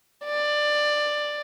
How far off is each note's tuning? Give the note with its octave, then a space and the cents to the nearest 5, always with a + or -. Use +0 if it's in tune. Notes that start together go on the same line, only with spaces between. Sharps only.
D5 +15